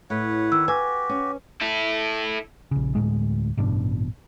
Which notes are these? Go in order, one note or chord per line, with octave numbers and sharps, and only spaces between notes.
A2 B4 C#5 F#5
D#3 E6
F#4 G4 B4 G#5
C#4
E4 A4
A#1 C#3
D2 A2 G#3
A1 G2 B2 D4